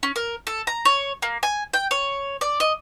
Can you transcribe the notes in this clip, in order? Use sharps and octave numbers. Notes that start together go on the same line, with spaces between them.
C#4
A#4
A4
A#5
C#5
A#3
G#5
G5
C#5
D5
D#5